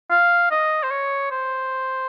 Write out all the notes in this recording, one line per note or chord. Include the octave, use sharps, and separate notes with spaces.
F5
D#5
C5
C#5
C5